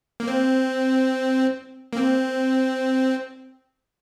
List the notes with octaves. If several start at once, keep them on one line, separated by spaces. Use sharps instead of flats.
A#3
C4
A#3
C4